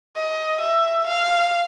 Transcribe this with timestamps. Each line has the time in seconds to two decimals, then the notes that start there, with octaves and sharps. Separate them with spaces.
0.16 D#5
0.61 E5
1.07 F5